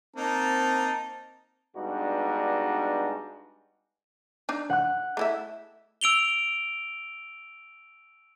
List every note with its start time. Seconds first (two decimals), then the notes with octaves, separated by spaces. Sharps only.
0.16 A#3 C4 D#4 A5
1.76 G2 G#3 B3 D4 D#4 F#4
4.49 D4 D#4
4.70 F#5 F#6
5.17 A3 E4 E5
6.01 E6 D7 F7 G7